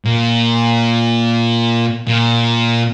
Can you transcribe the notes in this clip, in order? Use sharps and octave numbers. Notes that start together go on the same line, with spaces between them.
A#2
A#2